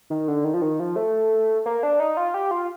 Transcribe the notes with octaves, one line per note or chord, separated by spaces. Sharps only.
D#3
D3
D#3
F3
D#3
F3
A3
A#3
D4
D#4
F4
G4
F4